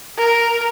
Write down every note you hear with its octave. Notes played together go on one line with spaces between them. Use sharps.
A#4